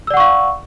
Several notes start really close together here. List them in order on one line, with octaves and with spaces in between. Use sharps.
E6 D5 F#5 C#6 F5